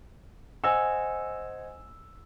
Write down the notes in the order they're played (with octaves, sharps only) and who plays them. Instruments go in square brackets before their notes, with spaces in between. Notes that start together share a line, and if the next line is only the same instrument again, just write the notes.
[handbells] C5 D#5 F#5 [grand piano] G#5 E6